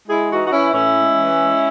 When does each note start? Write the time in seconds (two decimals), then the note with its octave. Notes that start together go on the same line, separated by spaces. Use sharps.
0.08 G#3 E4 G#4
0.30 E3 D#4 F#4
0.45 F#4
0.51 E3 C#4 E4
0.73 A2 C#4 E4
0.94 G#3
1.16 E3
1.37 G#3